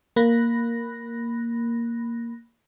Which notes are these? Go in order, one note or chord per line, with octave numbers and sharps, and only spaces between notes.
A#3 B5 F#6 A#6